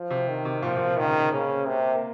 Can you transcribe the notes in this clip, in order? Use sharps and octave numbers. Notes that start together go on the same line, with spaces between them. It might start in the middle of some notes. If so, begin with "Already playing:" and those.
Already playing: F3
C3
D#3
C3
A#2 F3
A#2
C3
D#3
C#3
C3
C#3 A#3
C4
C3 A#3
A#3